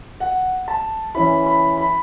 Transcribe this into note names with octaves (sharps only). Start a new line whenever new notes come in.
F#5
A5
E3 C#4 E4 B5
B5
B5